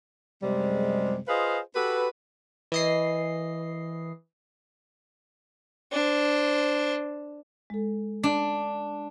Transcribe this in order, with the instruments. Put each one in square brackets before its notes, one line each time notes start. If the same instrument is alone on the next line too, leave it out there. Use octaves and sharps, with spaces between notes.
[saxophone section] F#2 C3 G3 G#3
F4 G#4 B4 C5 D#5 F5
F#4 G4 A4 B4
[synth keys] E3 D#5 C7
[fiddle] D4 C5
[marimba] G#3 A4
[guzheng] D4